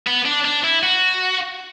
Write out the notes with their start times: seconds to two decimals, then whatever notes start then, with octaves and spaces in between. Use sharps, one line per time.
0.07 B3
0.25 D4
0.45 D4
0.64 E4
0.83 F#4